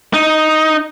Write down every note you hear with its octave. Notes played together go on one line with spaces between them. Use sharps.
D#4